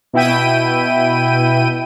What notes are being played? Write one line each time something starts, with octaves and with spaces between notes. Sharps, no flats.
B2 E4 G5 D#7